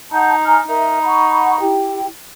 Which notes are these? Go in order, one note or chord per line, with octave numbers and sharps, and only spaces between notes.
D#4 F#5 A5 G6
G#5 A#5 F6
D#4 A#4 E5
F#5 B5 C#6
E4 G4 G5